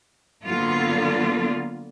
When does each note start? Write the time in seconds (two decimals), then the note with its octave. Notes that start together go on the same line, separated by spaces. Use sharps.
0.45 D3 F#3 A#3 B3 F4